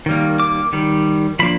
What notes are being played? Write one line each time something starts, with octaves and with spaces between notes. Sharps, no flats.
D#3 G3 A#3
D6
D#3 G3
F3 A#3 D4 B5